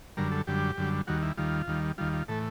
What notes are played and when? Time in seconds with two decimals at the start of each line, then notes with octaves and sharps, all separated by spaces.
0.17 F#2 D3 G3 A#4
0.32 A4
0.47 F#2 D3 G3 G4
0.77 F#2 D3 G3
1.07 D#2 D#3 G3 F#4
1.22 E4
1.38 D#2 D#3 G3 F4
1.67 D#2 D#3 G3
1.98 D#2 D#3 G3 F4
2.13 F4
2.28 A2 E3 A3 A4